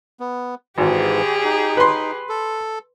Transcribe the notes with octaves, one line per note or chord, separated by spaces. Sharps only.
B3
G#1 G#2 E3 G4 G#4
D#4
B4 C6
A4